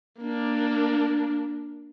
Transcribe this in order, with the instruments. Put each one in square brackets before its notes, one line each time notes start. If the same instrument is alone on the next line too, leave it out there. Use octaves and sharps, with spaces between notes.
[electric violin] A#3 D4